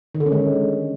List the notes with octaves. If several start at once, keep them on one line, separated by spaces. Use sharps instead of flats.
D#3
D3
C#4
G#3